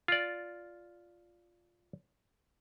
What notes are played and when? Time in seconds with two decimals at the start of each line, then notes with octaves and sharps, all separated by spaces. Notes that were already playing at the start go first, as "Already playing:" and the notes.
0.08 F4 D5